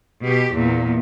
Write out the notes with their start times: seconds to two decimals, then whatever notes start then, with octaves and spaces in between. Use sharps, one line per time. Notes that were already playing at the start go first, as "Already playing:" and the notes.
0.24 B2 G4
0.54 E2 A#2